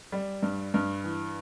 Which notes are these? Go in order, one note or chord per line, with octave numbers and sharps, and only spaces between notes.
G3
G2
G2
E3